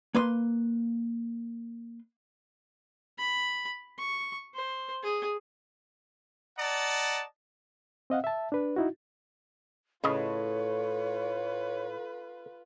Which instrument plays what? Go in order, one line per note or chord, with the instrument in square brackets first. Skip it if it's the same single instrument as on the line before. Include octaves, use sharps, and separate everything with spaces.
[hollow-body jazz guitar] A#3 B4 C6
[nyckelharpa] B5
C#6
C5
G#4
[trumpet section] D5 D#5 F#5 A5 A#5
[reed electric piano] C4 D#5 F5 F#5
E5 A5
D4 B4
D#4 E4 F#4
[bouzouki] A2 [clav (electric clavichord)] C#3 D#5 [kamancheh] F4 B4 [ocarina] C#5